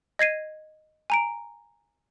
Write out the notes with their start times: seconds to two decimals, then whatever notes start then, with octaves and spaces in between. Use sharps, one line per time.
0.19 D#5 G#6 C7 D#7
1.10 G#5 A#5 D7